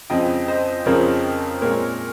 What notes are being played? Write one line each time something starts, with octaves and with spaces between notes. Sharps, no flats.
F2 C#3 F3 C4 D#5 G5
C5 D#5
F2 C#3 F3 C4 A#4 C#5
A#2 G#3 C4 A#4 C#5